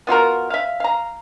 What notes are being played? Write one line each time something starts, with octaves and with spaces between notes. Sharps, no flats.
B3 F4 F#4 A#4
E5 F5
F5 A#5